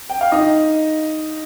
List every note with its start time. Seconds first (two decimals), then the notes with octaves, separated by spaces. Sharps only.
0.10 G5
0.21 F5
0.32 D#4 D#5